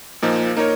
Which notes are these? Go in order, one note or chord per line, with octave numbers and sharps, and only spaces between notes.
A#2 F3 A#3 D#4
A#3 D#4 A#4 C#5